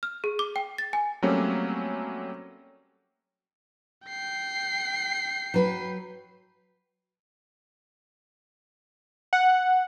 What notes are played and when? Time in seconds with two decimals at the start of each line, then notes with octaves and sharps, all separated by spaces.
0.03 F6
0.24 G#4
0.39 D6
0.56 G5
0.78 A6
0.93 G#5
1.22 F#3 G3 A3 A#3 C4 C#4
4.06 G5 C7
5.54 F#3 B4
9.33 F#5